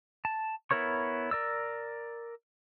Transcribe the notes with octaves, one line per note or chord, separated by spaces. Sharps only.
A5
B3 E4 A#4 C#5 C#6
A#4 D5 E6